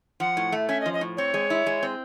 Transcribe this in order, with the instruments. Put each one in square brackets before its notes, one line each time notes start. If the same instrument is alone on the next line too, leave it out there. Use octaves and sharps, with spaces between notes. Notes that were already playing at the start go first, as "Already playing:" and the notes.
[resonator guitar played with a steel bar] F3 [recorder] F#5
[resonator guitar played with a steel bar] A2
A3
[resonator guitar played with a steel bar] C#4 [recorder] E5
[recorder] D#5
[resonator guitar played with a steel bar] F3
[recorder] D#5
[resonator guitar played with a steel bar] A2
[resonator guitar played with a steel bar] C4 [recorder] C#5
[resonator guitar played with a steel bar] G#3
E4
G#3
C4